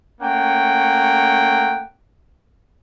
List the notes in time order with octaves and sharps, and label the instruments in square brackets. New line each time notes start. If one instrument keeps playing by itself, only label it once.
[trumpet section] A3 A#3 C#4 F#5 G5